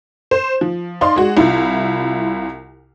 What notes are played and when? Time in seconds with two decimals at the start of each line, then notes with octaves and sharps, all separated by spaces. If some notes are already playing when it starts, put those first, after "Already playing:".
0.31 C5
0.61 F3
1.01 D#4 D5 F5 C6
1.16 G#3 F#4
1.37 C2 E4 F4